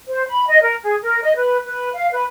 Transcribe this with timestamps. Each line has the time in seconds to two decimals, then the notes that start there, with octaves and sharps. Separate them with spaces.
0.08 C5
0.28 B5
0.48 D#5
0.62 A#4
0.83 G#4
1.03 A#4
1.22 D#5
1.36 B4
1.66 B4
1.94 F5
2.12 B4